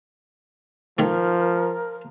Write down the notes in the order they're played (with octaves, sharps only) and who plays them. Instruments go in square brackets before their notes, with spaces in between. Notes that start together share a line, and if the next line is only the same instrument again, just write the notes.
[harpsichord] D#3 A3 [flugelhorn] F3 [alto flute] A#4